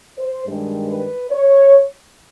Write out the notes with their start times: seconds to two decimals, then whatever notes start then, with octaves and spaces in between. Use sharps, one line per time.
0.18 C5
0.46 G2 D#3 G#3
0.88 B4
1.31 C#5